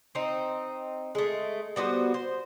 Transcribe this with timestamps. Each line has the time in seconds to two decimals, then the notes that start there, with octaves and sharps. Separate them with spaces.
0.15 C4 D#4
1.15 G#3 A3
1.76 G3 B3 F#4 C5
2.14 C5